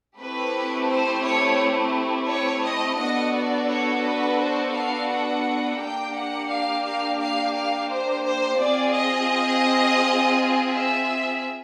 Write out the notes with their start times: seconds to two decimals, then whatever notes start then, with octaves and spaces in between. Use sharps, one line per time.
0.19 A3 C4 E4 G4 B4
0.89 C5
1.24 C#5
2.29 C#5
2.65 D#5
2.99 B3 D4 F#4 A4 D#5
3.34 D5
3.69 C#5
4.04 B4
4.39 C5
4.75 F5
5.09 F#5
5.79 A#3 D4 G4 G5
6.15 F#5
6.49 F5
6.85 F5
7.20 F5
7.55 F5
7.89 C5
8.24 C5
8.59 C4 F4 G#4 D5
8.95 D#5
10.70 E5